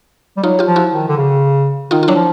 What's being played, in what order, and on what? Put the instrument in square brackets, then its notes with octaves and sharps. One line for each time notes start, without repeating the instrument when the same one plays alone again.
[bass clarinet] G3
[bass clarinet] F#3 [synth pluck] D#4 F4
[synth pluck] F4 G4
[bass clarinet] F3
[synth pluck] E4 F#4
[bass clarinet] D#3
D3
C#3
[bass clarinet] D#3 [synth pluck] D#4 F4
[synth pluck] F4
[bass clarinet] F#3 [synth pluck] D4 E4
[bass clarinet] F3